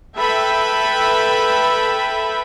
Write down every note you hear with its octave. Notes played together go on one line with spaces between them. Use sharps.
A4 B4 E5 G5 B5